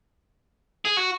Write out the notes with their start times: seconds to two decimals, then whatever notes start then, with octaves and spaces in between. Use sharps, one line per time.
0.85 G#4
0.97 F#4